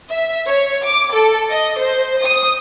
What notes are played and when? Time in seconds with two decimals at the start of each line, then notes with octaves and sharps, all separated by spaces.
0.10 E5
0.47 C#5
0.84 D6
1.13 A4
1.49 D#5
1.79 C5
2.21 D#6